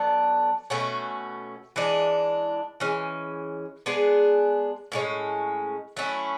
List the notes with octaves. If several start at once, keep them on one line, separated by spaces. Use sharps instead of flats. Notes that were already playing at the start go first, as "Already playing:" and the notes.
Already playing: F#3 B3 D4 A4
B2 A3 C#4 F#4
E3 G#3 D4
E3 G#3 C#4
G#3 B3 D4 G#4
A2 E3 G#3 C#4
F#3 A3 C#4 E4